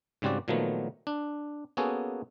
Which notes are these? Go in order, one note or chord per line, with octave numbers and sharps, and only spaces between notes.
G#2 C#3 G3 C4 F#4 D5
A#2 D#3 F3 F#3 A3 B3
D4
A#3 B3 C#4 F#4 G#4 A4